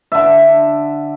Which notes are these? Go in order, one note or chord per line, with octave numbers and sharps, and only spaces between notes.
D3 E5